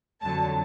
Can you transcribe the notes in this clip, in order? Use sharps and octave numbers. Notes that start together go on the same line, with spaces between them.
F2 D3 F#3 A5